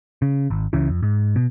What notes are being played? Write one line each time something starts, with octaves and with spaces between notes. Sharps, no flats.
C#3
G#1
C#2 C#3 E3
F2
G#2
B2